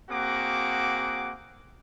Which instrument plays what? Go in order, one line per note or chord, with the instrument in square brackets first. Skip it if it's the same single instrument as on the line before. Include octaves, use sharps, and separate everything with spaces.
[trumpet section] A#3 C4 F#4 G#4 F#5 D6